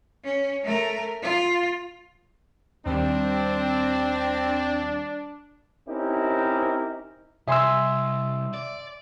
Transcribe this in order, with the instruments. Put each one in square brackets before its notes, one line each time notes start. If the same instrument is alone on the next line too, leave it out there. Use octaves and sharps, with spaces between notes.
[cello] C#4
A3 A#4
F4
[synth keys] D#2 D#3 G3 [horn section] C4 [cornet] D4
[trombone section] C4 C#4 D#4 E4 G4 A#4
[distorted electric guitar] C2 [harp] D#5 G#5 C6 [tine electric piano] E5 E6
[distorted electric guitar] D5